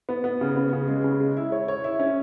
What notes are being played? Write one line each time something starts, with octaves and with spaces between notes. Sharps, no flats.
B3
B3
C#3
B3
C#3
G#3
C#3
G#3
E4
C#5
C#5
E4
C#4